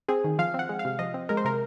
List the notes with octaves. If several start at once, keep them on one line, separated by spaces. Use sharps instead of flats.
C4 G#4
D#3
F3 F5
C4
F#5
G#3
F5
C3
F3 D#5
C4
G#3 A#4
C5
C3 A#4